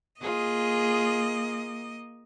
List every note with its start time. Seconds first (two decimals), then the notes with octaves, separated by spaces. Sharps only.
0.21 A#3 F4 G#4 D#5